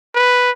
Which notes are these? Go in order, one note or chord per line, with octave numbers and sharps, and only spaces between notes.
B4